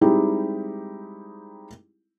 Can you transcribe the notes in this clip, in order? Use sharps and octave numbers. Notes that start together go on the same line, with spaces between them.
G3 G#3 C4 D#4 E4 G4